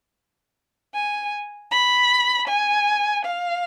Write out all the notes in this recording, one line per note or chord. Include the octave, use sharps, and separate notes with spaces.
G#5
B5
G#5
F5